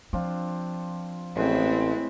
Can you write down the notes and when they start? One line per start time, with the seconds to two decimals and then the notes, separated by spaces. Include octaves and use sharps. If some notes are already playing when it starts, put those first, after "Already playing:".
0.13 F3 C4 D4 F4
1.36 A1 A2 G#3 C4 E4 B4